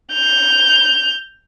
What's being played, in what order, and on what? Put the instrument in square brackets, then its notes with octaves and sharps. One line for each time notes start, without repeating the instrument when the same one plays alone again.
[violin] G6 F7